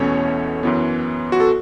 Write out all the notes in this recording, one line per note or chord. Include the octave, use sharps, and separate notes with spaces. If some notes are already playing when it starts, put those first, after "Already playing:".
Already playing: E2 B2 A3 C#4 C#5
F#2 E3 B3
F#4
A4